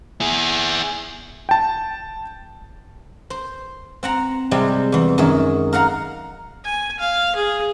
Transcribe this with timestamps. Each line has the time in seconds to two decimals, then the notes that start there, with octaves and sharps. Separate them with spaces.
0.21 E4 G#4
1.49 G5 A5
3.30 C5
4.03 C4 F#5 A#5
4.51 C3 G3 G#3 C4
4.92 E2 E3
5.18 F#2 D#3 G#3 E5
5.73 A#4 F5 F#5 A#5
6.64 G#5
7.00 F5
7.36 G#4